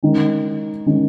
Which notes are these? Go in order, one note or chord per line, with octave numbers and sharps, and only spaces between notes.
D#3 G#3 C#4
D#3 G#3 C#4